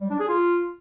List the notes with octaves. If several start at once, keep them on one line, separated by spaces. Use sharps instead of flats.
G3
D4
G#4
F4